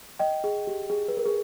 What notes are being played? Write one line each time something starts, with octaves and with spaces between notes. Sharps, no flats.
D#5 G5
G#4
G4
G#4
B4
A#4
G#4